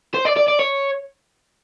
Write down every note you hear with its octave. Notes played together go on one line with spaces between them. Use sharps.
C5
D5
D5
D5
C#5